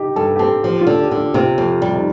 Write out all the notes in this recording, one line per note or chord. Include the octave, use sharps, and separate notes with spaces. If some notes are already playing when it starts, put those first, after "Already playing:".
Already playing: D#4 G4
G2 A4
G4
C4 A4
F3 G4
F4
D3
G4
D3
F4
C3 F4
F2
G3
D#4